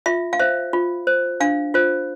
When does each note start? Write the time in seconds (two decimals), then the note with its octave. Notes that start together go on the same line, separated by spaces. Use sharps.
0.06 F4 E5
0.33 F5
0.39 C5 E5
0.73 F4
1.07 C5
1.40 D4 F5
1.74 F4 C5